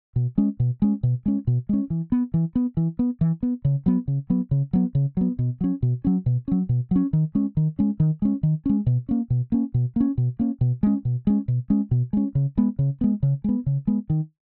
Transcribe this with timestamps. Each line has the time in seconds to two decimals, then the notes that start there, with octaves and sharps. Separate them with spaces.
0.16 B2
0.38 G#3 C#4
0.60 B2
0.82 G#3 C#4
1.03 B2
1.26 G#3 C#4
1.47 B2
1.69 G#3 C#4
1.90 E3
2.12 B3
2.34 E3
2.55 B3
2.77 E3
2.99 B3
3.21 E3
3.43 B3
3.65 C#3
3.86 F#3 B3
4.08 C#3
4.30 F#3 B3
4.51 C#3
4.73 F#3 B3
4.95 C#3
5.17 F#3 B3
5.39 B2
5.61 F#3 C#4
5.83 B2
6.04 F#3 C#4
6.26 B2
6.48 F#3 C#4
6.69 B2
6.91 F#3 C#4
7.13 D#3
7.35 G#3 C#4
7.57 D#3
7.79 G#3 C#4
8.00 D#3
8.22 G#3 C#4
8.43 D#3
8.66 G#3 C#4
8.86 B2
9.09 A#3 C#4
9.30 B2
9.52 A#3 C#4
9.74 B2
9.96 A#3 C#4
10.18 B2
10.39 A#3 C#4
10.61 B2
10.83 G#3 C#4
11.05 B2
11.27 G#3 C#4
11.48 B2
11.70 G#3 C#4
11.91 B2
12.13 G#3 C#4
12.35 C#3
12.57 G#3 B3
12.79 C#3
13.01 G#3 B3
13.23 C#3
13.44 G#3 B3
13.66 C#3
13.87 G#3 B3
14.10 D#3